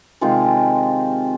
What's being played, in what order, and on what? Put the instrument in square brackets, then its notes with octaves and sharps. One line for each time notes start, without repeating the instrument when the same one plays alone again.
[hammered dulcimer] C3 D#3 G#3 C4 F4